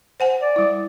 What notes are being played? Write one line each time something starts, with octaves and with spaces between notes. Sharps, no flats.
C5 F#5 G#5
D5
G3 E4